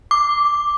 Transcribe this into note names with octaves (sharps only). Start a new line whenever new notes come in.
D6